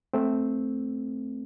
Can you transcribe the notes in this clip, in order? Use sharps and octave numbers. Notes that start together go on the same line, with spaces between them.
A3 C4